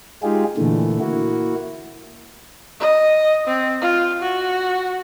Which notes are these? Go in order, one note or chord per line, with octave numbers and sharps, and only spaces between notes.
G#3 D#4 F4 G4 G#4
A#2 D3 E3 A3
A#3 E4 F#4
D#5
C4
F4
F#4